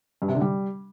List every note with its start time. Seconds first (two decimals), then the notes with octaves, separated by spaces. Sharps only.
0.22 G2
0.28 C3
0.35 D3
0.41 G3